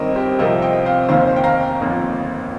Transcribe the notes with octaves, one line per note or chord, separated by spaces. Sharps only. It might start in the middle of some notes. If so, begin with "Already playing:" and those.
Already playing: G1 G2 D#3 C4 A#4 D#5
G4 C5
C2 C3 F3 C4 A#4 D#5
D#5 G5
C5 F5
F1 D#2 D#3 C5 F5
G5
F5 A#5
G1 F2 D#3 A#3